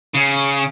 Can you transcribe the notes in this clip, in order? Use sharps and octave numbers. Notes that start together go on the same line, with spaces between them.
C#3